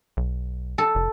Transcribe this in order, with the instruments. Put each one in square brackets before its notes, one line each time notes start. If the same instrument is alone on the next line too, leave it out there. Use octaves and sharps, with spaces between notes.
[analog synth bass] B1
[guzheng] A4
[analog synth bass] F1